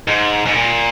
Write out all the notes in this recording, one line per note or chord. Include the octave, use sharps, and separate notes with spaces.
G#2
G#2
A#2